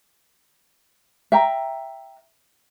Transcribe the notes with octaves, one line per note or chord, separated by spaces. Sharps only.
E5 G5 A#5